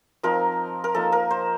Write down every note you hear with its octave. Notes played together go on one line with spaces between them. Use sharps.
F3 C4 D#4 A#4
A#4
F3 A#3 D#4 A4
A#4
C5